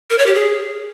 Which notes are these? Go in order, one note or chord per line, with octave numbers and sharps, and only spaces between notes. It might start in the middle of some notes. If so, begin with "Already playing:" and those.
A#4
C#5
G4
G#4